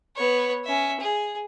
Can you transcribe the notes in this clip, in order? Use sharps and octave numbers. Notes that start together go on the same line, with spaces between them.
B3 C#5
C#4 E5
G#4